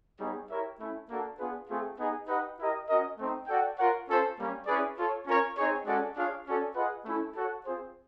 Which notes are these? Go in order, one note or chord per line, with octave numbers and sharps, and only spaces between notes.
G3 B3 D#4 G#4 C#5
E4 G4 A#4 C#5 E5
A3 C#4 E4
A#3 D4 F#4 A4
B3 D4 F4 G#4 B4
A3 C4 F4 G#4
B3 D#4 G#4
D#4 G4 B4 D#5 F#5
E4 G4 A#4 D#5
C#4 F#4 A#4 D#5
A3 C4 D#4
F#4 A4 D5 G5
F4 A#4 C#5 F#5
C#4 F4 A4 C5
G3 A#3 C#4
C#4 E4 G#4 B4 D5
F4 A4 C#5
C#4 F4 A#4 C#5
C4 D#4 G#4 C#5
G#3 C#4 F#4 A4 D5
D4 F4 G#4 C#5 F5
C#4 F#4 A4 D5
F4 G#4 B4 D#5 F#5
A3 C#4 E4 A4
F#4 A4 C#5 F#5
C4 F4 G#4 C5